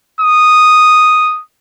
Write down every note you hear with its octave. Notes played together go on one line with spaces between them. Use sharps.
D#6